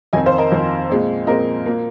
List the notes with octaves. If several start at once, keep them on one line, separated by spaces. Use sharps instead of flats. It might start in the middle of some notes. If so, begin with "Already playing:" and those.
F2 D#3 C4 D#5 G#5
C5 F5
A#4 D#5
F2 D#3 C4
A#2 G#3 C4
A#2 G#3 C4 A#4 D#5
A#2 A#3